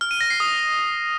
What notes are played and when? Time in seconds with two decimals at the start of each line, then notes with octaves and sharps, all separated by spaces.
0.01 F6
0.11 D#7
0.21 A#6
0.30 C7
0.40 D#6